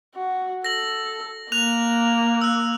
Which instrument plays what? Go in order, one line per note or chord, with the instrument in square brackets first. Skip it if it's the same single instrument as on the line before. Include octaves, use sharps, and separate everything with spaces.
[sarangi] F#4
[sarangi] A4 [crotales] A#6 F#7
[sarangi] A#3 [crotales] F#6 F7
[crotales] E6 F#6